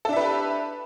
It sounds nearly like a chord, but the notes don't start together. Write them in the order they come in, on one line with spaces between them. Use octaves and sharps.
A4 D4 E5 B4 G4